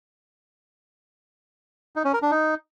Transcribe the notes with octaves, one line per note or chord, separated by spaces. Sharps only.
D#4
C#4
A#4
D4
D#4